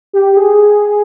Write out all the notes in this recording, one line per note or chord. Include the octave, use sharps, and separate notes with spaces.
G4
G#4